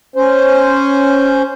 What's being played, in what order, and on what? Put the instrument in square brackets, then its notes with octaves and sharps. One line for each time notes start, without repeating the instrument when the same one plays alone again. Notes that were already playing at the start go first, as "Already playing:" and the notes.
[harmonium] C#4 C5